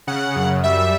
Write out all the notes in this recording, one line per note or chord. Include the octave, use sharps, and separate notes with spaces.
C#3 F#5
F#2
G3 E5